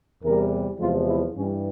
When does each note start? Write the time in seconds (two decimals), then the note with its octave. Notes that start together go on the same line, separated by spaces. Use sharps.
0.22 E2 C3 E3 G3 A#4
0.79 E2 C3 F3 G#3 F4
1.08 E4
1.36 G2 E3 G3 C#4